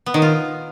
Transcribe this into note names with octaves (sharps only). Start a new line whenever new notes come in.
B3
D#3
F4